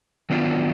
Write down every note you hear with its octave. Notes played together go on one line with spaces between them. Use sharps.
D#3 F#3 B3 D4 F4